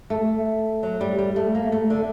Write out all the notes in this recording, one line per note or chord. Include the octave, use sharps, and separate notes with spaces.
A3
F#3
G3
G3
A3
A#3
A3
D3